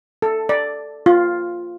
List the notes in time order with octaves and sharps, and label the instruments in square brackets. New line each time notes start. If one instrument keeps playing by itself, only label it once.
[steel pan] A4
D5
F4